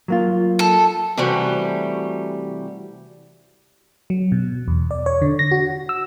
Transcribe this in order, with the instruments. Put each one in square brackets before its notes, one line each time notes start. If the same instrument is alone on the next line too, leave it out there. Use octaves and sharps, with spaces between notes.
[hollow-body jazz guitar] F#3 A#3 F4
[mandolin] A4
[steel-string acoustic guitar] C3 E3 G3 A3 F#4 G4
[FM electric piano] F#3
B2
E2
D5
C#5
D3
A#6
F#4
E6